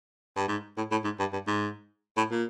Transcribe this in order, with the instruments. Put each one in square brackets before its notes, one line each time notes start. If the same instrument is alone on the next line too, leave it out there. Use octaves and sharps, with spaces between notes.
[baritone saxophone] G2
G#2
A2
A2
G#2
G2
G2
G#2
A2
A#2